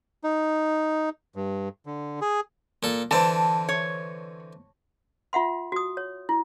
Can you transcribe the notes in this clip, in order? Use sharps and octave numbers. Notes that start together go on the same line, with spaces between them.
D#4
G2
D3
G#4
A#2 A4
D3 E3 C4 A5
C#5
F4 E5 F#5 C6
F#4 D#6
C#5
E4